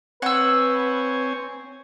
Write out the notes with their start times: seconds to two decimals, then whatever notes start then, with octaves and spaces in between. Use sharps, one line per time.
0.22 C4 B4 C#5 F#5 G#5 E6